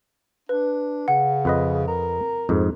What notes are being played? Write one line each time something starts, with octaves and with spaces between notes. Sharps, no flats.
D4 B4
C#3 F#5
F2 B4 D#5
A#4
F2 G#2